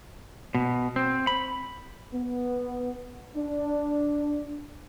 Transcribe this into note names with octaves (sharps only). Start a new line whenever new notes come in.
B2
C4
B5
B3
D4